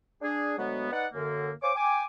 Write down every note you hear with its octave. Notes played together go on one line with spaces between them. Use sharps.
D4 G#4
D2 F#3 G#3 B3
D#4 B4 D5 F#5
F#2 D3 A#3
C5 C#5 F5 G#5 D6
G5 G#5 D6